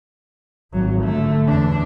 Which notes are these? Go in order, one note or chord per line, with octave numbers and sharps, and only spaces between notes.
G#1 F#3
D3 A3
E2 D4